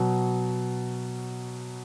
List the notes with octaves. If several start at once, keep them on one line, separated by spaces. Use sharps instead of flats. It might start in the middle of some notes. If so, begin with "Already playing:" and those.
Already playing: B2 F#3